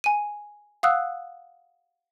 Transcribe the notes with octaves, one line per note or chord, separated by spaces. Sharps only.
G#5 D#7
F5 F#5 D#6 E6 F#6